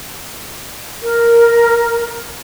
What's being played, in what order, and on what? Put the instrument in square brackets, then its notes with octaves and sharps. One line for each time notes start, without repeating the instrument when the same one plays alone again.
[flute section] A#4